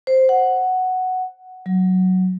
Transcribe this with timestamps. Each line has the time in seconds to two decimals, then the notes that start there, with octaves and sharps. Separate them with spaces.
0.07 C5
0.29 F#5
1.66 F#3